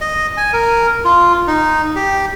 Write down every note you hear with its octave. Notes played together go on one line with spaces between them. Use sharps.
D#5
G#5
A#4
F4
D#4
G4